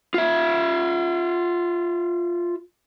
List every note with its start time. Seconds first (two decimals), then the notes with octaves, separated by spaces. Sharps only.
0.14 F4 E5